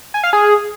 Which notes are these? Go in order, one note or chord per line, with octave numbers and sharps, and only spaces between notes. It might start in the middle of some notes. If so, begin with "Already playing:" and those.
G#5
F5
G#4